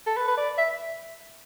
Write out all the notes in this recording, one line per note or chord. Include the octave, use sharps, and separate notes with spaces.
A4
B4
B4
D5
E5